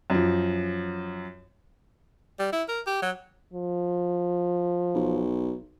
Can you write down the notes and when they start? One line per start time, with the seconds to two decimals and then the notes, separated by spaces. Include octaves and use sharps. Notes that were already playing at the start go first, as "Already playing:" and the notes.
0.10 F#2 F3
2.39 G3
2.53 E4
2.68 A#4
2.87 G4
3.02 F#3
3.54 F3
4.95 B1